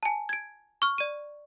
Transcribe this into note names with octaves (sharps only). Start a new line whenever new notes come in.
G#5 A5
G#6 D7
C#6 F6
D5 D#7